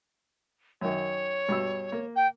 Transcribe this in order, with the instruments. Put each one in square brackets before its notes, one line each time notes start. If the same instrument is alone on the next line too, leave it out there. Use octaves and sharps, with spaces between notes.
[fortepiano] F#2 D#3 [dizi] C#5
[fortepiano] G2 B2 E6
A#3
[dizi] G5